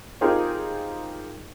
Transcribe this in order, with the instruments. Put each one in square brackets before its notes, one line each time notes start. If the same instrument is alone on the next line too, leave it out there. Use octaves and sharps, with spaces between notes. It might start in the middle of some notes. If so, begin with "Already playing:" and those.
[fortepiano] C4 D#4 F4 G4 G#4 A#4